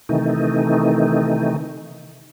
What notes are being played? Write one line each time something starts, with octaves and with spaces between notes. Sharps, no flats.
C3 D#3 E3 A3 D#4